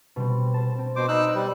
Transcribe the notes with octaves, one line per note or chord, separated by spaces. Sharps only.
B2 G3 C4
C5 A5
C4
B2 C5 D6
D#4 B4 D5 E6 F#6
G3